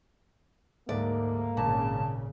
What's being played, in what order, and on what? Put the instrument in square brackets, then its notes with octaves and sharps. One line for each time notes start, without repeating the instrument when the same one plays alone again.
[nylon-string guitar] D2 D5 [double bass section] G#2 [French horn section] A#3
[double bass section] G#1 C#3 [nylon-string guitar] A#2 [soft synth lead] A5